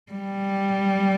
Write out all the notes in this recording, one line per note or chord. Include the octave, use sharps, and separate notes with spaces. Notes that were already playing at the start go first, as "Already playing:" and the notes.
G3